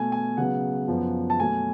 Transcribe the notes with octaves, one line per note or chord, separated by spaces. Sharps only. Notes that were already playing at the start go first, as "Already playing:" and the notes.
Already playing: B2 A3 G#5
G#5
C#3 F#3 B3 F#5
F#2 F3 B3
A5
B2 F#3 A3 G#5